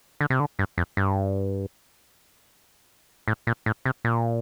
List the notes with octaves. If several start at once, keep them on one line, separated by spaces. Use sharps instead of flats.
D3
C3
D3
G2
F2
G2
A2
A#2
A2
C3
A#2